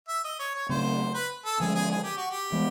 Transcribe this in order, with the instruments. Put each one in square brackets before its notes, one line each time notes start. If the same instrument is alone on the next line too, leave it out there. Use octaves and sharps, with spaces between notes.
[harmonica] E5
D#5
C#5
C#5
[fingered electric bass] C#3 F#3 A3 C4 [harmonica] C5
[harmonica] B4
A4
[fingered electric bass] D3 F3 G#3 C#4 [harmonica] G#4
[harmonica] G#4
G#4
G4
F#4
G4
[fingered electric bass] E3 G#3 B3